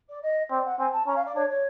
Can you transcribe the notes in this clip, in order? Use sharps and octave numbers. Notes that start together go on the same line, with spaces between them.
D5
D#5
C4 D5
F#5
C4 G#5
A5
C#4 A#5
F5
D5
D4 C#5
C#5